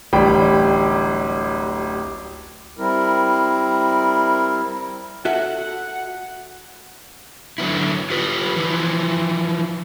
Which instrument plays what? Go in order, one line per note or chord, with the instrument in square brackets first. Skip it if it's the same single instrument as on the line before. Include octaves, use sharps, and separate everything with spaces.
[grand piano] D1 A1 G3 G5 B5
[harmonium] G3 C4 E4 A#4
[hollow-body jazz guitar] F#4 A4 E5 [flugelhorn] F#5
[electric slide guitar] D3 F#3 B3 E4
F4 G4 B4
E3 F3 E4